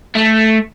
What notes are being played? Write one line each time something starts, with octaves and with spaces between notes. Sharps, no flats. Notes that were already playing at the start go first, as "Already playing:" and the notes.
A3